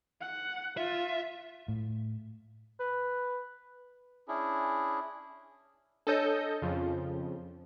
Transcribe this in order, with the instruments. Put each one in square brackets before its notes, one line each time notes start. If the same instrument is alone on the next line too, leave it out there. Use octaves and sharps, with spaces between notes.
[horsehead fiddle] F#5
[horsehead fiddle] F4 [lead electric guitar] E5
[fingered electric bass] A2
[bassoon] B4
[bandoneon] C#4 D4 E4 G#4
[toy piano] D4 C#5 [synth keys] A4 D#5 G6
[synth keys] F2 C#3 F3